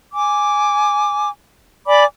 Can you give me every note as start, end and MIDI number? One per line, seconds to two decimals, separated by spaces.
0.13 1.29 80
0.13 1.29 86
1.86 2.04 74
1.86 2.04 80
1.86 2.04 83
1.86 2.04 86